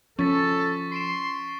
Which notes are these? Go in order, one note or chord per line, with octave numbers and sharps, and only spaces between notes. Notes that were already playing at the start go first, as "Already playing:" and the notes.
F3 C#4 A4 C#6 A6 B6
C6 C7 D7 E7